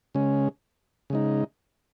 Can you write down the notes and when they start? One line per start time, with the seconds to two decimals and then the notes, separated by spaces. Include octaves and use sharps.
0.15 C#3 G#3 C#4
1.10 C#3 G#3 D#4